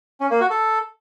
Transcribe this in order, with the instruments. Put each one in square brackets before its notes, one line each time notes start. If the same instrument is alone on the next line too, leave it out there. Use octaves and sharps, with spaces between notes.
[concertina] C#4
A#3
F#4
A4